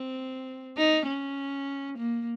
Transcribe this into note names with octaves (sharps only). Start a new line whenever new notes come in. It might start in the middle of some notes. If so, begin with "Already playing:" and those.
Already playing: C4
D#4
C#4
A#3